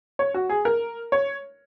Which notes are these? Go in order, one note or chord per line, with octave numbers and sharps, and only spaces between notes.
C#5
F#4
G#4
A#4
C#5